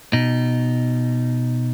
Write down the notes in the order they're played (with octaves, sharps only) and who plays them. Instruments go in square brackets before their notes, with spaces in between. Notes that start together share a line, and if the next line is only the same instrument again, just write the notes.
[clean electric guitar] B2 D#4